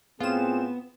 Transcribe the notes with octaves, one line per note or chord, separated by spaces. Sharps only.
A2 B3 C4 F4 G#4 E7